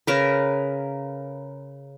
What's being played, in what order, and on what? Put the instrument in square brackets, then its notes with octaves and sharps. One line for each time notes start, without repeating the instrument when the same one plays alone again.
[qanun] C#3 A#4 B4